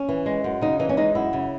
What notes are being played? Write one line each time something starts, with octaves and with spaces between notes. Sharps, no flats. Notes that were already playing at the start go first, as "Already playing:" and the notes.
Already playing: C#4
E3
G#3
F#2
C#3 D#4
E3 D#4
C#4
G#3 D#4
F#2 E4
C#3